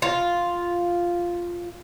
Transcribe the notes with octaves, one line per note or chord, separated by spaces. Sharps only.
F4